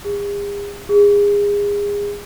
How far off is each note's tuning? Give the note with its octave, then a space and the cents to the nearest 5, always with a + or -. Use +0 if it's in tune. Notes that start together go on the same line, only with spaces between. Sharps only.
G#4 -45
G#4 -30